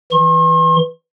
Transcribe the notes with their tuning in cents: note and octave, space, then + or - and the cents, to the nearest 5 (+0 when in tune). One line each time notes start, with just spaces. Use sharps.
E3 +0 C6 +45